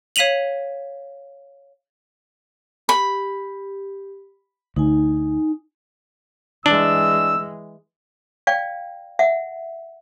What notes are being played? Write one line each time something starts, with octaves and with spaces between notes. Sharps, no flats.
C#5 F5 B6 D#7 F7 F#7
G4 B5
D2 D#4 G#5
E3 G#3 D4 E6
D5 F5 G5
E5 F#5